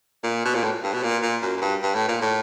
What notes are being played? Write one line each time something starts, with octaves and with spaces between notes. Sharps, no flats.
A#2
B2
A#2
A2
G2
B2
A#2
A#2
F#2
F#2
G2
G2
A2
A#2
A2